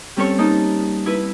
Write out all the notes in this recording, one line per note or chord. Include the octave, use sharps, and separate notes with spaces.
G3 C4 C#4 A4 C#5 C#6
A#3 D#4 A5
E4 B4